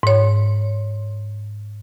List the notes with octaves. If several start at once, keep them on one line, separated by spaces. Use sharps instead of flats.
G#2 C#5